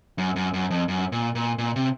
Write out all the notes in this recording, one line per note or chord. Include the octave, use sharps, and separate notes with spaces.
F#2
F#2
F#2
F2
F#2
A#2
A#2
A#2
C3